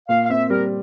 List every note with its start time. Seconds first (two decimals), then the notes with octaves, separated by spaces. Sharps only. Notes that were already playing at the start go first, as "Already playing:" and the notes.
0.09 A#2 F5
0.25 F5
0.30 C4 E5
0.50 G3 A#4